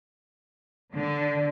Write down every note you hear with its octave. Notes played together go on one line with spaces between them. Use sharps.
D3